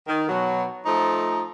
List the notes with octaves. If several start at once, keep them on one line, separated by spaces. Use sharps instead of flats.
D#3
B2 F#3
F3 A3 D#4